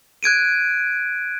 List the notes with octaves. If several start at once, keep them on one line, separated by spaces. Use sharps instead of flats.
F#6 G#6 D7 D#7